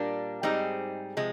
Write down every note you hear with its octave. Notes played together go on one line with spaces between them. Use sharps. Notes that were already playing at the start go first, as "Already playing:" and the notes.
Already playing: A#2 G3 A#3 D4
G#2 G3 C4 D#4 G#4
C3 F3 G#3